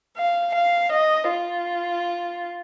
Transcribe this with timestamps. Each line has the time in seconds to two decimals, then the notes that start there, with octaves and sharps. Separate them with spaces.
0.17 F5
0.55 F5
0.92 D#5
1.30 F4